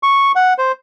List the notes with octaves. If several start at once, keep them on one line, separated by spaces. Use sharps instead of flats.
C#6
F#5
C5